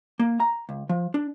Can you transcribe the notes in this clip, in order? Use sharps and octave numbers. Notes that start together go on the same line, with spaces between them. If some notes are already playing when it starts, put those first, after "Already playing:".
A#3
A#5
C#2
F3
D4